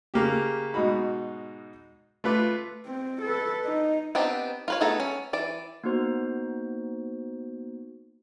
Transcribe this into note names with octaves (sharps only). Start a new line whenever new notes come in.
C#3 A#3 G4
G#2 B2 D#4 F#4 B5
A3 F4 B4 D6
C4
A4 B4
D#4
B3 C4 D4 D#4 G4
F4 B4 C#5
A3 B3 G#4 A4 A#5
C#4
E3 D5
A#3 B3 D#4 F#4 C5